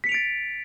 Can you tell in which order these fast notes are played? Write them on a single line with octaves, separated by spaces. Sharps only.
B6 C#7 F7 D7 A6